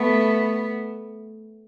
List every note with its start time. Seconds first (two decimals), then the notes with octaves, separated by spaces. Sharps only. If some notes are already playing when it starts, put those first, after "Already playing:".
Already playing: A3 B3